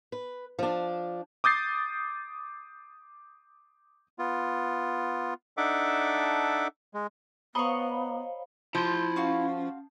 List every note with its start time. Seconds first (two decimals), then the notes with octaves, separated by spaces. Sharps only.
0.12 B4
0.59 F3 D4
1.44 D6 D#6 G6 A6 C7
4.19 B3 F4
5.57 D4 D#4 A4 E5 F#5 D6
6.94 G#3
7.55 B3 C5 C#5 D#5 F5 A#5 B5 C#6
8.75 F3 E4 C6
9.16 C#4 F4 F#4 F5